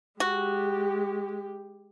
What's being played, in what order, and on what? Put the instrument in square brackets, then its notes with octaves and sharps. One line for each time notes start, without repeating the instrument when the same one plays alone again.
[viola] G#3 G4 [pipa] F#4